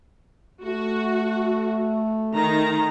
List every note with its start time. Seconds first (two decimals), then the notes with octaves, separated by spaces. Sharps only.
0.64 A3 F#4
2.33 D#3 A#5